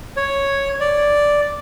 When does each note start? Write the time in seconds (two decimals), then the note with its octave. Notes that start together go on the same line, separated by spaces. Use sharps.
0.17 C#5
0.80 D5